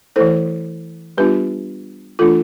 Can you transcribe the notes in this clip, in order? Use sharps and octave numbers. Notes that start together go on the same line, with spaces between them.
E3 A3 E4 A4 C5
G3 B3 D4 F4 G4 B4
E3 A3 D4 F4 A4